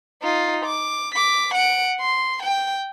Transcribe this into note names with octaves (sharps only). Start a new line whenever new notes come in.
D#4 F4
D6
D6 B6
F#5 D7
C6
G5